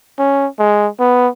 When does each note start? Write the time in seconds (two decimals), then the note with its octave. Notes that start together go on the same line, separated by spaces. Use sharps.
0.19 C#4
0.59 G#3
1.00 B3